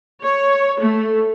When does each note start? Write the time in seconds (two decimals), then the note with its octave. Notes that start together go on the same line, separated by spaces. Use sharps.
0.24 C#5
0.81 A3